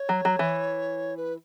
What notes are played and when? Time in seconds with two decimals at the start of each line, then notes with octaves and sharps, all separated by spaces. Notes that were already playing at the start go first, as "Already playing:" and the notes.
Already playing: C#5
0.09 F#3
0.25 F#3
0.39 E3
1.17 B4